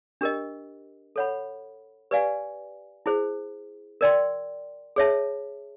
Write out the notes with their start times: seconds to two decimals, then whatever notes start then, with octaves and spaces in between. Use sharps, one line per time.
0.21 D4 G4 A#4 D#5
1.16 A4 C#5 F#5 B5
2.11 G4 B4 D5 F5 G#5
3.06 E4 G#4 C5
4.01 A#4 D5 G5 C6
4.96 G#4 C#5 E5 A5